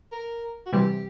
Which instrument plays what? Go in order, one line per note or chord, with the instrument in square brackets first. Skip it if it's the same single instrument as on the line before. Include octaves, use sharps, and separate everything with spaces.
[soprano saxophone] A#4
F#4
[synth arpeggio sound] C3 E3 G3 [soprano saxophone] G4